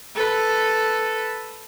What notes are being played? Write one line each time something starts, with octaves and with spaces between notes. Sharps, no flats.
A4 B4